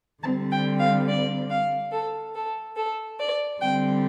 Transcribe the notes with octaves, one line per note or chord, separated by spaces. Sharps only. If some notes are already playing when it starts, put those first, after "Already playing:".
D3 G3 C4 A5
G5
F5
D5
F5
A4
A4
A4
D5
D3 G3 C4 G5